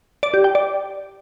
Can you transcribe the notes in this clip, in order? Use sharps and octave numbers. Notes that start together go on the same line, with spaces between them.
D5
G4
G5
D5